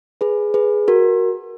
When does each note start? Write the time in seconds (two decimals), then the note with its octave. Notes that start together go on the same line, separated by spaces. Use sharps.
0.21 G#4 B4
0.54 G#4 B4
0.88 F#4 A#4